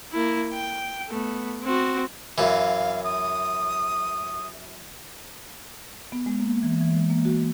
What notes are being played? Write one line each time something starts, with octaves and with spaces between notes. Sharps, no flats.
A#3 E4
G5
A3 B3
C4 F#4
F#2 E3 F5
D#6
B3
G#3
A#3
E3
E3
G#3
A#3
F#4